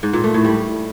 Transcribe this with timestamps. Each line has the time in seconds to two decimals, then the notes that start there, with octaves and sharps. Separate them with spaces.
0.03 G#2
0.13 A#2
0.24 A3
0.34 A2
0.45 G3